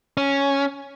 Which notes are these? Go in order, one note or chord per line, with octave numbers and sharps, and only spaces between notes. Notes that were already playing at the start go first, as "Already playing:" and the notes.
C#4